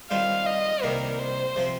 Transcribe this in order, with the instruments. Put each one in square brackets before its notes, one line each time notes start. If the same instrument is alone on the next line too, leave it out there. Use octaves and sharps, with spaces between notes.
[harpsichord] D#3 G3 C4 F4 C5 [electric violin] F5
[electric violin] D#5
[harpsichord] C2 C3 D#3 G3 A#3 [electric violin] A#4
[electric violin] C5
[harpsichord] C3 F3 C4